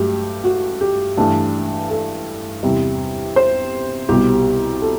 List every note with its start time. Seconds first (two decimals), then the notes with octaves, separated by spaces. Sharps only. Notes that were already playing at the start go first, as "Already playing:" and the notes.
Already playing: G2 F#3 A3 G4
0.44 F#4
0.81 G4
1.17 G2 E3 A3 D4
1.90 A4
2.63 E2 C3 G3
3.36 C5
4.09 C2 B2 G3 G4
4.82 A4